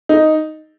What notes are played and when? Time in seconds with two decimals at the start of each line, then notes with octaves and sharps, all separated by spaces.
0.09 D#4